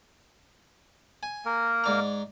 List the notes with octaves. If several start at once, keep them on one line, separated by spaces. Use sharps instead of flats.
G#5
A#3 A#4
G#2 D5 A#5